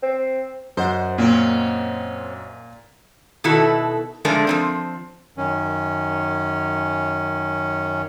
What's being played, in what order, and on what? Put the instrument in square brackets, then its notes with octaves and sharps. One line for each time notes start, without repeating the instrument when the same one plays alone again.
[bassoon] C4
[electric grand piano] F#2 D#5 F#5 [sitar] C5
[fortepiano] A#2 [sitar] C4 C#4
[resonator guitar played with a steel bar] B2 D#3 E4 F#4 A4
D3 F3 G#3 A3 A#4 D5
F3 G3 C4
[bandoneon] F#2 D#3 C#4